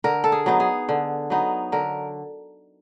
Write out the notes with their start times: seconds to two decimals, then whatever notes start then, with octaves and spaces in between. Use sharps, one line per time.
0.04 D3 A#4
0.24 A4
0.32 G#4
0.46 F#3 B3 D#4
0.60 G#4
0.89 D3
1.30 F#3 B3 D#4
1.72 D3 A#4